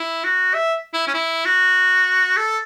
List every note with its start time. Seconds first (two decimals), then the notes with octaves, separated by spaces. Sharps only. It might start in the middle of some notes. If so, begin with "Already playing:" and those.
Already playing: E4
0.24 F#4
0.54 E5
0.94 E4
1.07 C#4
1.14 E4
1.45 F#4
2.37 A4